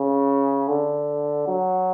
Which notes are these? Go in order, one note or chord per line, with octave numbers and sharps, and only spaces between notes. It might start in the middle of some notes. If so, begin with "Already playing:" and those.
Already playing: C#3
D3
F#3